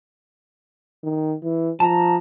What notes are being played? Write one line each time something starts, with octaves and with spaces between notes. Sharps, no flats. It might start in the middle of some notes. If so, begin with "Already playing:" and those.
D#3
E3
F3 A5 A#5